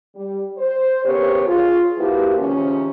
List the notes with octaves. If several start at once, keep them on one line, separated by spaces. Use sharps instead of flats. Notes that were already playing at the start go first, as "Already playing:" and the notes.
G3
C5
C#3 B3 G4 A#4 C#5
F4 G#4
F3 A#3 E4 F#4 G4 B4
G#2 C3 D#3 F3 C#4